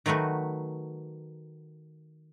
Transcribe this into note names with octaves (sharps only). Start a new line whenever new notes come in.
D#3 F#3 A3 F#4 B4